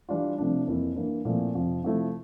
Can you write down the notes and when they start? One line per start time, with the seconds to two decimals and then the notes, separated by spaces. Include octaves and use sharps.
0.09 E3 G3 D4 F4
0.38 C3 F3 A3 D4
0.67 F2 E3 A#3 E4
0.96 G2 E3 A#3
1.25 A#2 F3 A3 C4 E4
1.54 F2 C3 F3 C4
1.82 C3 F3 A3 E4